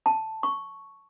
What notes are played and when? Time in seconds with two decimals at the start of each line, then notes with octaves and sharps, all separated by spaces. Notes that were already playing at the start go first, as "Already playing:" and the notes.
0.06 A5
0.43 C#6